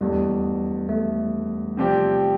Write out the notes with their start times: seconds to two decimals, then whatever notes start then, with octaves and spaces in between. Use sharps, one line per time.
0.01 E1 E2 B2 G3 A3
0.89 A3
1.77 C3 F3 C4 G4 D5